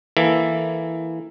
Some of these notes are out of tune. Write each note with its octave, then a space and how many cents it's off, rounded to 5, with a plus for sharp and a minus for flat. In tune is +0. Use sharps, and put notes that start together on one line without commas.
E3 +0 A#3 +0 A4 +0